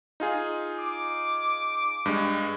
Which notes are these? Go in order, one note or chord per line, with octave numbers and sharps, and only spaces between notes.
D#4 F4 G#4
D6
G2 G#3